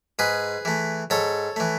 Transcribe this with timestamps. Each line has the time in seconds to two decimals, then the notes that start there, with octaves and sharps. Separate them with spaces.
0.19 G#2 G#4 B4
0.65 E3 A3
1.10 G#2 A4 C#5
1.56 E3 A3